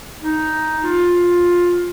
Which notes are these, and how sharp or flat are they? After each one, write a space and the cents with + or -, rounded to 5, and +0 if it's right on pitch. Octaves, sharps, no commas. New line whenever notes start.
D#4 +5
F4 +15